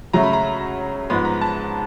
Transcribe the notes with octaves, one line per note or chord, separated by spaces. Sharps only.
C#3 F#3 A3 A#5
B5
A#5
G#2 F3 G#3 B3 B5
A#5
A5